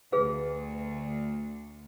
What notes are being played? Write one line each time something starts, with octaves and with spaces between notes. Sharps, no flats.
D2 G#4 B4 F5